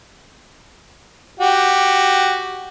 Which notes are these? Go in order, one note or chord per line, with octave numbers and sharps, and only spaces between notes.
F#4 G4